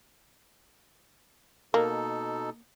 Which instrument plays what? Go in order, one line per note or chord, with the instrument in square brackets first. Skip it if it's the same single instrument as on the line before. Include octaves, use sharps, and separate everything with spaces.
[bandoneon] B2 D#4 A4 [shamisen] A#3